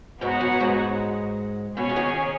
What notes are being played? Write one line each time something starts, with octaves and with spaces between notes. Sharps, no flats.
G#2 G#3 B3 D#4 F#4 C#5 F#5
F#2 F#3
G#2 G#3
B2 B3 C#4 G#4 C#5 G#5
C#3
D#2 D#3